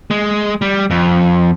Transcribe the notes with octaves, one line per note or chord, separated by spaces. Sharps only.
G#3
G3
F2